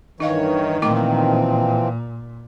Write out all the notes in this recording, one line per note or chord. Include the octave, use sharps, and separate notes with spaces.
G2 D#3 E3 D#4 C#5 D#5 F5
A#2 E3 F3 A3 C4 D#4 D6